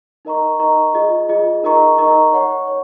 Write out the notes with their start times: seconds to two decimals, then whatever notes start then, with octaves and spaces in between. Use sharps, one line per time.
0.25 D#4 A#4 D#5 A#5 C#6
0.59 D#4 A#4 D#5 A#5 C#6
0.94 F4 G#4 D#5
1.29 F4 G#4 D#5
1.63 D#4 A#4 D#5 A#5 C#6
1.98 D#4 A#4 D#5 A#5 C#6
2.33 C#5 F#5 C#6
2.67 C#5